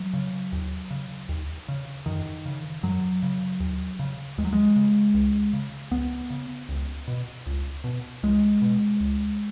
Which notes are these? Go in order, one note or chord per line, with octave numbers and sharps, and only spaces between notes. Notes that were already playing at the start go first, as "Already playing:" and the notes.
Already playing: F#3
C#3
D#2
C#3
D#2
C#3
F#2 D#3
C#3
F#2 F#3
C#3
D#2
C#3
D#2 G#3
F#3
G#3
C#3
C#2
C#3
C#2 B3
C#3
C#2
B2
C#2
B2
C#2 G#3
B2
C#2